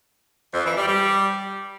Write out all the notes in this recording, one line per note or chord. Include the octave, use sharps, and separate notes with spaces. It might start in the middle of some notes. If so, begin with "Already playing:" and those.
F2
E3
G3
G3